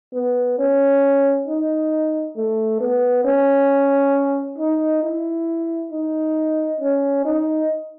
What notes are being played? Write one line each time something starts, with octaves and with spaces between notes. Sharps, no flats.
B3
C#4
D#4
A3
B3
C#4
D#4
E4
D#4
C#4
D#4